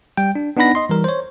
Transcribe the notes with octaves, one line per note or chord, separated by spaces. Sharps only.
G3 G5
D4
B3 D4 D#4 F#5 B5 A#6
D#5 C6
E3 G3 A#4
C5 C#5